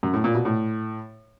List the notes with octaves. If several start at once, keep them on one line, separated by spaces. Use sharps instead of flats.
F#2
A2
A#2
B2
A2